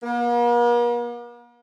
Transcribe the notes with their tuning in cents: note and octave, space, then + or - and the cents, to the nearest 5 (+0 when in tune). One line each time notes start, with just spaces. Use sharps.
A#3 +45